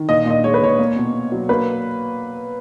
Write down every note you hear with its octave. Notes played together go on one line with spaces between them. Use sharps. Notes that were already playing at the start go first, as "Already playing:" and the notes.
Already playing: D#3
A#2 D#5
A#2 D#5
G#3 C#5
B4
A#2 C#5
A#3
B2
B2
F#3
A#3 B4